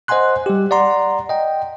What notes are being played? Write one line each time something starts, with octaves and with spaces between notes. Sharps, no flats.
C5 D#5 F#5 G#5 C6 F#6
G3 G4
D5 F#5 A#5 C6
D#5 G5